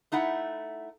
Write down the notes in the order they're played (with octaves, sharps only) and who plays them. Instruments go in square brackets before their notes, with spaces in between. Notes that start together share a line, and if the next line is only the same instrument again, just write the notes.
[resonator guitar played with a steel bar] A3 D#4 E4 F#5